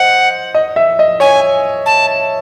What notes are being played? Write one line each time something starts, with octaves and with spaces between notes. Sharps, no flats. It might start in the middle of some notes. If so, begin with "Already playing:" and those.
Already playing: C5 D#5 F#5
D#5
E5
D#5
C#5 G#5
A5